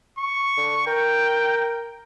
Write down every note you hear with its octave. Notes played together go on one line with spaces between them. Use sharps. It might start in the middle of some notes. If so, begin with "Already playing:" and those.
C#6
D3
A#4 G5